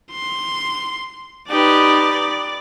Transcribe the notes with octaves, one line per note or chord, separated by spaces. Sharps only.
C6
D#4 G4 B4 D5